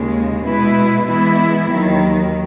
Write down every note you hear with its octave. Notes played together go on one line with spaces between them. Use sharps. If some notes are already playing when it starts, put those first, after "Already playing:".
Already playing: D#2 C#3 G#3
B2 G#3 B3 E4 B4
E3 G#3 B3 E4
D#2 D#3 F#3